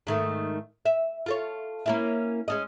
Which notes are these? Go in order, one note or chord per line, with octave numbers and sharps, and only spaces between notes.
G#2 D#3 A3
E5
F4 A4 C#5
A#3 C#4 E4
G#3 C#4 D#5